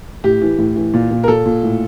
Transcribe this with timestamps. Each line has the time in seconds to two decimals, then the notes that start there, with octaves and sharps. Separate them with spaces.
0.24 A2 G4
0.42 E3
0.58 A2
0.76 E3
0.94 A#2
1.11 A#2
1.24 A#4
1.28 A#2 A4
1.46 A#2
1.63 A2